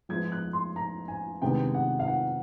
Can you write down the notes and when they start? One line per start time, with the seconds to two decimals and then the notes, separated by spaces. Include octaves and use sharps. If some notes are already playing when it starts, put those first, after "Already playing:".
0.09 F3 G#3 B3 E4 G#6
0.32 F#6
0.53 C6
0.76 A#5
1.08 G#5
1.42 C3 D#3 G#3 B3 D4 G5
1.75 F#5
2.00 F5
2.08 F#5